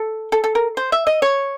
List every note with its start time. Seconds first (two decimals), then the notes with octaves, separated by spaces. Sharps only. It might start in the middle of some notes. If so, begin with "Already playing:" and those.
Already playing: A4
0.32 A4
0.44 A4
0.55 A#4
0.77 C5
0.92 E5
1.07 D#5
1.22 C#5